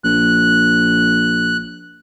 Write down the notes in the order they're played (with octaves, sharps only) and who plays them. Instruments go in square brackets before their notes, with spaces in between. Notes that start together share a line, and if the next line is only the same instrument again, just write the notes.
[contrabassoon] A#1 [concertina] F#6